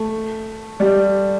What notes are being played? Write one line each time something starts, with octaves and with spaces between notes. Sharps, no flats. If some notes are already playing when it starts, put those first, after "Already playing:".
Already playing: A3
G3